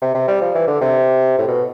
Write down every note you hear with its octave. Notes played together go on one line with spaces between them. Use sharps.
C3
C3
G3
F3
E3
D3
C3
A2
B2